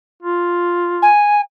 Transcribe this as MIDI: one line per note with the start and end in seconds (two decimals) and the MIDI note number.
0.23 1.09 65
1.02 1.41 80